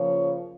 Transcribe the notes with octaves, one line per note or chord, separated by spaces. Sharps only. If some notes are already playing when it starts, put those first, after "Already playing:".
Already playing: C#3 F3 A#3 C#5